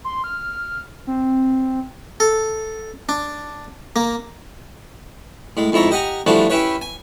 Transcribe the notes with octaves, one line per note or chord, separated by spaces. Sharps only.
C6
F6
C4
A4
D4
A#3
A2 G#3
F2 G#2 E4 C#5 A#5
G4 D#5 F#5 G#5 A#5
E3 F3 G3 A3 D4 F#4
C#4 E4 G4 B4 C#5
G#5